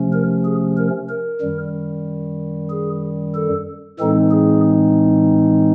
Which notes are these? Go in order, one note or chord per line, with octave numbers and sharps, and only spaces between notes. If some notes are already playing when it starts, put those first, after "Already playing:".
Already playing: C3 F3 A3 C#4
A#4
G#4
A#4
A#4
F#2 D#3 G3
G#4
A4
A2 E3 G#3 C4 D#4 A4
G#4